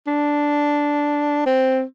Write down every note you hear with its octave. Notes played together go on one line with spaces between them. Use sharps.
D4
C4